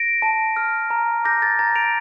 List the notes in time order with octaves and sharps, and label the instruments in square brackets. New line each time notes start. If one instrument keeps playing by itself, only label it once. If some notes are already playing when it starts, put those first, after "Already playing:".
Already playing: [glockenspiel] A#6 D7
A5
F6
A#5
D6 G6 A#6
A6
A#5 A6
D7 F7